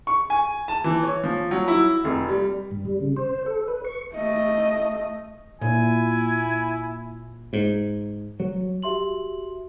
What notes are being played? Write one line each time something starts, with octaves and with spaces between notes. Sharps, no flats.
C#6
G#5
A5
E3
C#5
F3
F#3
E4
F1
G3
G2
G3
C#3
C5
A4
B4
C#6
A3 D#5
A#2 E4 G#5
G#2
F#3
F#4 G4 E5 C6 F#7